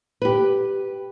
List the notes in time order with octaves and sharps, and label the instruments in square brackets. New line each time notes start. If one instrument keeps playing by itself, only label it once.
[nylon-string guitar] G4 B4